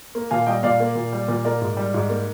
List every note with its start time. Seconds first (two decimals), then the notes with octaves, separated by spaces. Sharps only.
0.15 A#3
0.31 A#2 F5 G#5
0.47 G3 D#5 G5
0.63 A#2 D5 F5
0.80 A#3
0.95 A#2
1.12 G3
1.28 A#2
1.45 A#3 A#4 D5
1.61 G#2
1.77 G3
1.94 G#2
2.10 A#3